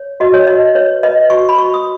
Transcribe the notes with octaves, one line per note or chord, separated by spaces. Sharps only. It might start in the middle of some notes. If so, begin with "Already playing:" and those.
Already playing: C#5
F#4 D#5
C#5
F#4 D#5
B4 C#5
B4 D#5
F#4 C#6
B5
F#4 C#6
D#6